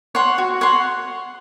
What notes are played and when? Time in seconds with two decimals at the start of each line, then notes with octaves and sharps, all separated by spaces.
0.15 C#5 F#5 C6
0.38 F#4
0.61 C#5 F#5 C6